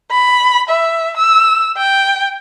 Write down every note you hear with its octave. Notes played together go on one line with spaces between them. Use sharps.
B5
E5
E6
G5